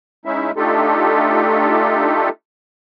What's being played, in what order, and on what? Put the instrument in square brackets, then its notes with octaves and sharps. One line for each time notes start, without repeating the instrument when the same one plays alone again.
[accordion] G#3 C#4 D#4 E4 E5
A3 D4 D#4 F4 G4 A4